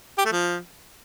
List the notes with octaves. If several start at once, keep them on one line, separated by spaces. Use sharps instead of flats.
G4
A3
F3